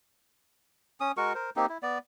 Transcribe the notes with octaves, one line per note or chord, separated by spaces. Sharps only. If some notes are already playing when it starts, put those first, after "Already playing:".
C#4 D#6
G#3 F#4 A#4 C#6
A#4 C5
A#3 C4 D#4 G4
E4
B3 D5